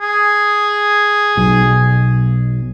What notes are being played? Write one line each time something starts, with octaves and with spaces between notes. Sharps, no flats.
G#4
B1 B2